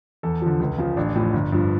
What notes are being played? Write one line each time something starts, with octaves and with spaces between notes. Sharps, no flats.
E2 A4
D3 F3
C#2
C#3 F3
A1 D4
A2 F3
G1
G2 F3